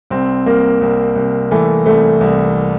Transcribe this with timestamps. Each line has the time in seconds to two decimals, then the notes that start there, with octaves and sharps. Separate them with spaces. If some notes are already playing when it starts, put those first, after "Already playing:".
0.10 C2 C4
0.46 C2 A#3
0.81 C2
1.16 C2
1.51 E3 A3
1.86 C2 A3
2.21 C2